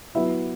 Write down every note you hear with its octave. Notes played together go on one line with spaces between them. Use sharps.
F#3 B3 E4 E5